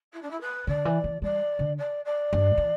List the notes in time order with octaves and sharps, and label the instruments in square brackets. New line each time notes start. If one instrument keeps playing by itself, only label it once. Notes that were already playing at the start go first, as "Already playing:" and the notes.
[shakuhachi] E4
D4
E4
B4
[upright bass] D3 [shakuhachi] D5
[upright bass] E3
E3
[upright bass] G3 [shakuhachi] D5
[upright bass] D3
[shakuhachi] D5
D5
[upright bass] G2
E3